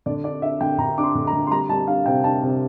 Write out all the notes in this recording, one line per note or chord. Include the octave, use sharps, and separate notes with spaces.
D3 D5
D4 D5
D4 E5
D3 G5
D3 A#5
D4 D6
C6
D3
A#5
D3
C6
G3 A#5
G3 A5
D4 F5
C3 G5
D4 A5
C3